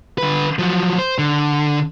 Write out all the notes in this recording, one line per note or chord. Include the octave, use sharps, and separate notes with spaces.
D3 B4
F3 F#3
C5
D3